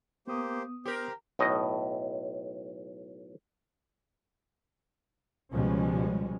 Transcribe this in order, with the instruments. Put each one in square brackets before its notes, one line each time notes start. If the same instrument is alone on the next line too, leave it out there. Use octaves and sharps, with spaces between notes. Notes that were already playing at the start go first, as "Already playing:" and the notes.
[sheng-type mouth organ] A#3 G4 C5 [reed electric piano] B3 D#6
[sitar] G4 A#4 [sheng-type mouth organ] C5
[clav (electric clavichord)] B1 A2 D#5
[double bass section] C#2 B2 F3 G3 G#3 C#4